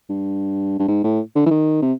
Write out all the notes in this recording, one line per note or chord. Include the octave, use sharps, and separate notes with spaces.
G2
G2
G#2
A2
D3
E3
D#3
C3